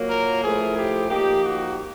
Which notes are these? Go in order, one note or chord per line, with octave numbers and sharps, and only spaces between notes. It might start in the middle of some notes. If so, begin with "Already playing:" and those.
Already playing: A#2 F#3 A#3
A#4
A2 F3 A3 G#4
G4
F3 A#3 D#4 G4
F#4